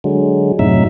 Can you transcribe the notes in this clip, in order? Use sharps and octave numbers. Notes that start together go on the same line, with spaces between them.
D3 F#3 G#3
F#2 A2 C3 F#3 D#4 E5